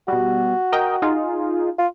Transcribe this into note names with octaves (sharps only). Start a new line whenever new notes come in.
B2 G3 F#4
A#4 D#5 G5
D#4 F4 G#4
F4